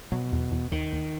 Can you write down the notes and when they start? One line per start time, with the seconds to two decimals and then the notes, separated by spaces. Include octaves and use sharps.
0.12 B2 F#3
0.32 E2
0.51 E2
0.72 D#2 D#3
0.93 D#2